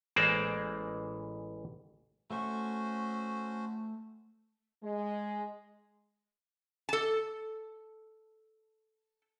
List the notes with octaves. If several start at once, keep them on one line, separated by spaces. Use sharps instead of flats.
A1 E3 G#3 A#3 C5 D5
A3 C#4 F#4 C5 C#6
G#3
A4 A5